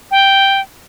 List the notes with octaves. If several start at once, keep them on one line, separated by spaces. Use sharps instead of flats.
G5